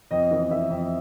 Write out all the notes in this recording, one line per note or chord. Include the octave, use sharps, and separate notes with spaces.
F2 D#5
E3 D#5
E3 E5
F2